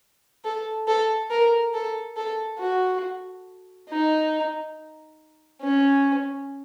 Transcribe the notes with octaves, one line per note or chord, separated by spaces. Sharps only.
A4
A4
A#4
A4
A4
F#4
D#4
C#4